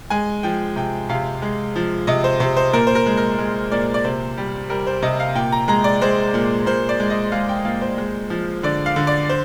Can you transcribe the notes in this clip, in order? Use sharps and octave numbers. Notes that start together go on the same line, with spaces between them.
G#3 G#5
F3 G5
C3 G5
C3 F5
G#3
F3
C3 D#5
C5
C3 C5
C5
A#2 A#4
C5
A#4
G#3
A#4
G#3
A#2 D5
D5
C3 C5
G3
G3 A#4
C5
C3 D#5
F5
A#2 G5
A#5
G#3 A#5
D5
G#3 C5
A#2
A#2 C5
D5
G#3
D#5
G#3 F5
G5
A#2 F5
C5
G#3
F3
D3 D5
F5
D3
D5
C5